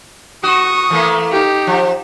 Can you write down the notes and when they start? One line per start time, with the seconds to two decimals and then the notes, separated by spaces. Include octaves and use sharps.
0.43 F#4 C#6 D#6
0.90 E3 A3 A#3
1.32 D#4 G4
1.67 F3